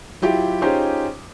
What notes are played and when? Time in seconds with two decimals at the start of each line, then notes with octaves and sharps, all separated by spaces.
0.22 F#3 E4 F4 G4
0.62 C#4 D#4 F4 G4 G#4 C5